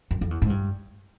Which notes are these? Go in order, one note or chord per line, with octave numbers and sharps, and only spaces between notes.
F#2
F2
E2
G#2
G2